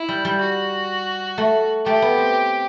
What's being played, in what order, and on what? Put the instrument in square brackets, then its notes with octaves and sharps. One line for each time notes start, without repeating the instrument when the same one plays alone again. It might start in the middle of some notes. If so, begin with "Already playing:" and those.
Already playing: [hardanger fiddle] E4
[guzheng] G3
G3
[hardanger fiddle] F#4
[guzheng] A3
[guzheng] A3 [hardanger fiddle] G4
[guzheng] B3
C4